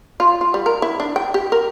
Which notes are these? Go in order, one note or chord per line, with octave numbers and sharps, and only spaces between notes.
F4
F4
G3
A#4
E4
D4
G5
G4
A#4